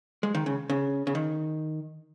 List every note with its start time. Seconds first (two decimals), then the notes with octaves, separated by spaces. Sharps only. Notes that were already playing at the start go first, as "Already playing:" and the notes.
0.23 G#3
0.35 D#3
0.46 C#3
0.70 C#3
1.07 C#3
1.15 D#3